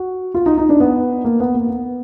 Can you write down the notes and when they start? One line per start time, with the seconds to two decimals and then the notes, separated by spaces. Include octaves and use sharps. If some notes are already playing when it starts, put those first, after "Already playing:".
Already playing: F#4
0.34 F4
0.46 D#4
0.58 D#4
0.69 D4
0.80 B3
1.25 A#3
1.40 B3
1.54 A#3
1.69 B3